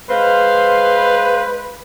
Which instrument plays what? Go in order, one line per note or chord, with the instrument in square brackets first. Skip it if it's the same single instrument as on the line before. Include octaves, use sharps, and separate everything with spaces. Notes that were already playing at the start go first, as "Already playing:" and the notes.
[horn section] G#3 C5 F5 [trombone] B4